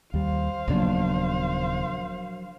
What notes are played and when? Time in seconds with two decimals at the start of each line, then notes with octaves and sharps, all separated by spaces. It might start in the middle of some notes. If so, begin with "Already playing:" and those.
0.14 D#2 G3 C5 F5
0.68 D#1 C#3 F3 F#3 A#3 B3 D4